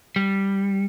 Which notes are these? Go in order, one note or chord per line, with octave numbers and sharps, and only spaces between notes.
G3